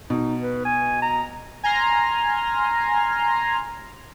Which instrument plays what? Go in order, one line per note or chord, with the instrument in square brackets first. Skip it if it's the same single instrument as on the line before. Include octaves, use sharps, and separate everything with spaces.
[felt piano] B2 [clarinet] D#4
[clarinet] B4
G#5
A#5
[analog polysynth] G#5 A#5 C6 F6